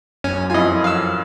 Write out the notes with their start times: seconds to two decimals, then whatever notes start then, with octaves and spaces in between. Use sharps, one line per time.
0.24 F#2 C#4 G#5
0.50 F2 E4 F4 D#5 G#5
0.84 F5 E6